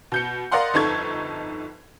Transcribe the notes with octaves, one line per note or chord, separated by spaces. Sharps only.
B2 G6 C#7
A#4 D5 D#5 F5 F#5 C6
G1 F2 D#4 A4 C#6 G#6